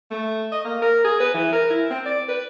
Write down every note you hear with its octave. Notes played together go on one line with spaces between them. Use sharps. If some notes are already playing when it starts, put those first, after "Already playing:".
A3
D#5
A#3
A#4
G#4
B4
E3
A#4
E4
C4
D5
B4